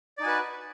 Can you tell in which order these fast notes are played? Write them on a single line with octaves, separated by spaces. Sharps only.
D5 D#4 G#5 F#4 B4